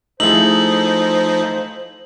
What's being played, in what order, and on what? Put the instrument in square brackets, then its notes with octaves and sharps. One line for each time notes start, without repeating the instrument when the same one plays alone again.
[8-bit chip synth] F3 D#4 [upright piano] A3 E4 G#4 [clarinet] C5 [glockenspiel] F#7